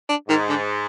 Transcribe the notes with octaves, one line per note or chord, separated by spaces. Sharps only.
D4
G#2 D#3
D3